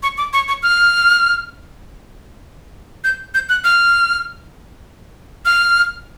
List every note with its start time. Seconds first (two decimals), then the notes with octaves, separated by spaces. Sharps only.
0.03 C#6
0.18 D6
0.33 C#6
0.48 C#6
0.63 F6
3.04 G6
3.34 G6
3.49 F#6
3.64 F6
5.45 F6